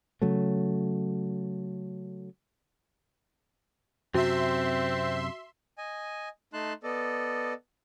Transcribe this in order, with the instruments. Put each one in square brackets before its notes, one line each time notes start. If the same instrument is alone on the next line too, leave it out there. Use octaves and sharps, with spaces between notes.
[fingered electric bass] C#3 F#3 A3
[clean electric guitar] F#2 C3 [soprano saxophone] C4 [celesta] F#4 [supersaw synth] E5 C6
[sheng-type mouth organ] D#5 G#5
A3 D#4 A5 C6 F#6
B3 A4 D5 D#5